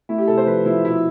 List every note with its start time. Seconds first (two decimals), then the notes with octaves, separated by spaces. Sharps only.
0.09 A3 E4
0.18 G4
0.28 C3 A4
0.37 C5
0.47 F3 B4
0.66 F3 E4
0.85 B2 E4